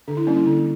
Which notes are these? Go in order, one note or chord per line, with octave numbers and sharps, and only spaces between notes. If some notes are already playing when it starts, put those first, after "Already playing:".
D3 D4
E4
G3 A#3 C#4 D4
E4
D3